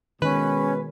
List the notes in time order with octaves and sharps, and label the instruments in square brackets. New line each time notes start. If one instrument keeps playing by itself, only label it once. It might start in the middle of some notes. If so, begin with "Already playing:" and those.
[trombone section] B2 G#3 [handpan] D#3 [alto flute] C#4 [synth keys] B4